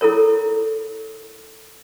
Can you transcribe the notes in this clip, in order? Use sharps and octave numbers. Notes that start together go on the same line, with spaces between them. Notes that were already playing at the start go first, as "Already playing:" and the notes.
E4 A4 A#4 C#5